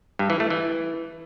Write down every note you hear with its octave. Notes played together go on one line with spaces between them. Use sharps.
G2
E3
A3
E3